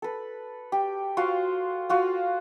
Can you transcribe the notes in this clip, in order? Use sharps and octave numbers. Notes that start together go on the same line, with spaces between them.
A4 B4
G4
F4 F#4 C5 F5
F4 F#4 F5